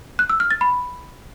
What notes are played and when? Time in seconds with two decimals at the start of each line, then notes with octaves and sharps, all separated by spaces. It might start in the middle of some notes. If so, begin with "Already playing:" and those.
0.19 F#6
0.30 E6
0.40 F6
0.51 A6
0.61 B5